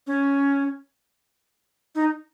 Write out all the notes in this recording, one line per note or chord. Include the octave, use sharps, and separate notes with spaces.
C#4
D#4